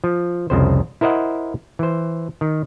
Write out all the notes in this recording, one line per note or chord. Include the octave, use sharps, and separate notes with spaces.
F3
C2 F2 C#3 C5
E4 A#4 C5 D#5 F#5
E3 C5
D#3